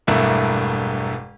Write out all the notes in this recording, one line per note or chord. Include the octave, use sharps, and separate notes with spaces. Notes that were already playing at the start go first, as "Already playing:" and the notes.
E1 G2 A3 A#3 E4